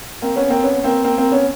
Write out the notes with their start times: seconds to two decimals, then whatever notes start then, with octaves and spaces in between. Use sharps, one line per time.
0.22 A#3 C4
0.36 B3 C#4
0.50 A#3 C4
0.64 B3 C#4
0.84 A#3 C4
1.04 A#3 C4
1.18 A#3 C4
1.32 B3 C#4